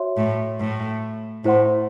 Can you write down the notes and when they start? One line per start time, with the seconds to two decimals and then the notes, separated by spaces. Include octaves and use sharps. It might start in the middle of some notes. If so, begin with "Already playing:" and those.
Already playing: F#4 C#5 E5 C6
0.17 A2
0.60 A2
1.44 A2 E4 C5 F#5 C6